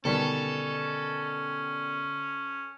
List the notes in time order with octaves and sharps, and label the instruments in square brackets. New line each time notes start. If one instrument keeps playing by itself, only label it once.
[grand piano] B2 D#3 G3 [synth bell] D3 D5 [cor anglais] C#4 [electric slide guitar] A4